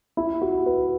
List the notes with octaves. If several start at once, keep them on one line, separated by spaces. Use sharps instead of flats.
E4
F#4
B4